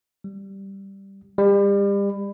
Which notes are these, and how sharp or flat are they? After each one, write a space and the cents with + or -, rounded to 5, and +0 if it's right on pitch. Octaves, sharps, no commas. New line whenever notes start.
G3 +0
G3 +35